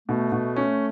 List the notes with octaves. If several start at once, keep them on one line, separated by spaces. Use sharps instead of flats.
B2 A3
B2
C#4